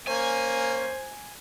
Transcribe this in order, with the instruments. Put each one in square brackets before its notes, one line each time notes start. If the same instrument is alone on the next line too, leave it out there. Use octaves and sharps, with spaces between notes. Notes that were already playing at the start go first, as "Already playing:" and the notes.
[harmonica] A#3 C#4 [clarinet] C5 [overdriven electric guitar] G#5